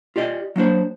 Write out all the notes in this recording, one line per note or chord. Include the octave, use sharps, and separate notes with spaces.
F4 G4 D5 D#5
F#3 A#3 D4 C5